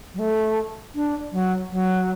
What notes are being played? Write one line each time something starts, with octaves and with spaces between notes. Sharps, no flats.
F#3
A3
D4
F#3
F#3